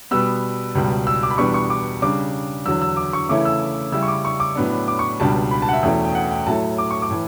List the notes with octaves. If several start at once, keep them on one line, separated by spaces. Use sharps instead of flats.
B2 G3 B3 E6
C#2 B2 G3
E6
D6
B5
E2 B2 G3 B3 D4 C#6
C#6
D6
C#3 G3 D4 D6
E2 D3 F#3 E6
E6
D6
C#6
C#3 E3 A3 C#4 E4 D6
E6
C#3 G3 C#4 E4 E6
C#6
D6
C#6
D6
A2 F#3 B3 D4
D6
C#6
C#2 B2 G3 D4 A5
B5
A5
F#5
E5
E2 B2 A3 C#4 G5
G5
F#5
G5
A2 F#3 A3 A5
D6
C#6
D6
A2 E3